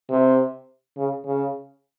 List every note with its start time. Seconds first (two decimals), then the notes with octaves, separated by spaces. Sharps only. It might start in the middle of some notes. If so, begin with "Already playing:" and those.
0.10 C3
0.97 C#3
1.26 C#3